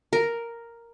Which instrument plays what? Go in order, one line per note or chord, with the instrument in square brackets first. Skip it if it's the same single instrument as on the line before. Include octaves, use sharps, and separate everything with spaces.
[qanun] A#4